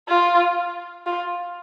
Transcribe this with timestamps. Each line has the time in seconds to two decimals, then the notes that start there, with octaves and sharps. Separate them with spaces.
0.08 F4
1.06 F4